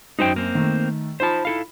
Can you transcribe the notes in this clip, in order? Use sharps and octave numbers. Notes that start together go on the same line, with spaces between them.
F#2 D#4 C5 G5
A#3 C4
D#3 A3
D#4 F4 C5 A5 B5
E4 A4 F5